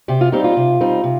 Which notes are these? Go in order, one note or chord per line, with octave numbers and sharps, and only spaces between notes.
C3 G4
F4
G3 C4 D#4 G4
F4
C3
G3 C4 D#4
C3